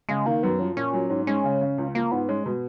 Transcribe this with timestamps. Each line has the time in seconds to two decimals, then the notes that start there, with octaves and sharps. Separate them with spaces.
0.09 C#3 G#3
0.26 D#3 A#3
0.43 F#2 B3
0.59 F3 C#4
0.76 A#2 C#4
0.93 F#3
1.10 G#2
1.27 G#3 C#4
1.44 C#3
1.61 C#3
1.78 C#2
1.94 F3 A#3
2.11 G#2 B3
2.29 G#3 C#4
2.46 B2